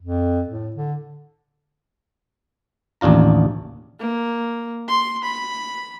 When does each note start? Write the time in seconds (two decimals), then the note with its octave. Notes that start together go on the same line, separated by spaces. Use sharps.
0.01 F2
0.48 A2
0.76 D3
3.01 A1 D#2 D4 F4 A#5
4.00 A#3
4.88 C6
5.24 B5